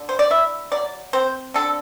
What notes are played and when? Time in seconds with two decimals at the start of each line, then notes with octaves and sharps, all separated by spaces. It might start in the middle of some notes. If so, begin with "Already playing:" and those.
Already playing: D3
0.09 C5
0.19 D5
0.30 E4 E5
0.72 F#3 D5
1.13 C4 C5
1.54 D3 A4